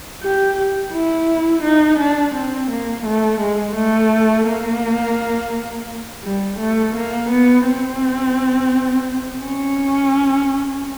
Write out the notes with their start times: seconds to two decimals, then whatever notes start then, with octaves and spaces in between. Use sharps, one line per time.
0.23 G4
0.93 E4
1.63 D#4
1.99 D4
2.35 C4
2.70 A#3
3.06 A3
3.40 G#3
3.76 A3
4.47 A#3
6.24 G3
6.59 A3
6.96 A#3
7.30 B3
7.66 C4
9.43 C#4